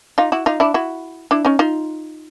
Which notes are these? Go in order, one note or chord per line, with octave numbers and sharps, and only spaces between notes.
D#4 F4
E4 F#4
D#4 F4
D4 E4
E4 F#4
D4 E4
C#4 D#4
D#4 F4